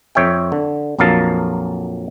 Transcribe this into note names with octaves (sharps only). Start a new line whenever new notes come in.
F2 C#5 E5 G5
D3
A#1 F2 F#3 A#4 F5 A5